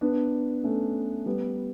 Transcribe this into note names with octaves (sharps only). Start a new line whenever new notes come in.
B3 D4
A3 C#4
G3 B3